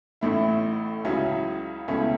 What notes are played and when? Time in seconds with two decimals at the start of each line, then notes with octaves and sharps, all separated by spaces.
0.21 A1 A2 A3 E4
1.05 C#2 C#3 F#3 C#4 E4
1.88 C#2 B2 A3 C#4 E4